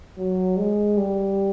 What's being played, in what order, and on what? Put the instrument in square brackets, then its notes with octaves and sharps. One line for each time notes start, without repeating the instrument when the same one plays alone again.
[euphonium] F#3
G#3
G3